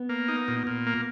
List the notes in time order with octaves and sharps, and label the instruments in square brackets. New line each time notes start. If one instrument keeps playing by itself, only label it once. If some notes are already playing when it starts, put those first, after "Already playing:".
Already playing: [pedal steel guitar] B3
[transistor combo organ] A#3
D#4
A#2
A#2
A#3